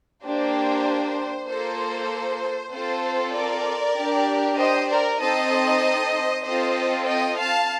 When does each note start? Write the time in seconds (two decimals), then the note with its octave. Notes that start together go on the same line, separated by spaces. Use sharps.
0.24 A#3 D4 G4 C5
1.48 A#3 F4 A4 C5
2.72 C4 F4 A4 C5
3.34 A#4 D5
3.96 D4 G4
4.58 C5 D#5
4.89 A#4 D5
5.20 C4 D#4 A4 C5 D#5
6.44 C4 F4 A4 C5 D#5
7.06 D#5 G5
7.38 F5 A5